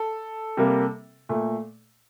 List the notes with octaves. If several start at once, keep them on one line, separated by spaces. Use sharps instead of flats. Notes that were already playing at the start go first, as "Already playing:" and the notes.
Already playing: A4
C3 G3 A#3
A#2 A3